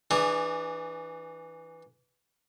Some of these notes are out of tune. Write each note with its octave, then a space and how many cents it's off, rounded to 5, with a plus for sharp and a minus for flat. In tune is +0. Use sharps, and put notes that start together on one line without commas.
E3 +0 D4 +30 G#4 +0